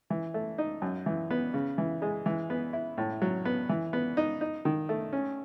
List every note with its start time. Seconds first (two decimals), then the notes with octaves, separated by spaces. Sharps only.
0.10 E3
0.34 A3
0.58 D#4
0.82 F#2
1.06 E3
1.31 B3
1.54 C#3
1.78 E3
2.02 G#3
2.26 E3
2.50 B3
2.73 E4
2.98 A2
3.22 F#3
3.45 B3
3.69 E3
3.93 B3
4.17 D#4
4.41 D#4
4.65 D#3
4.89 A3
5.13 C#4